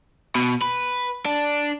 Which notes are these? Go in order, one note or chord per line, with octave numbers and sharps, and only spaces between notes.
B2
B4
D4